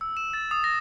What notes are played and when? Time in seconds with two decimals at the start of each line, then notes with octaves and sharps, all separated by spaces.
0.01 E6
0.17 E7
0.33 A6
0.51 D#6
0.64 A#6